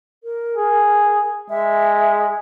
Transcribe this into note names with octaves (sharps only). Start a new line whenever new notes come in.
A#4
G#4
G#3 E5